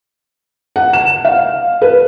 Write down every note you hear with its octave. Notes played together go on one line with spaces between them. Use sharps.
F#5
E7
F5
B4